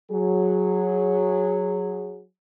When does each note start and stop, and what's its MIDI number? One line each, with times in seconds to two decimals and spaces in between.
0.11 2.24 54
0.11 2.24 68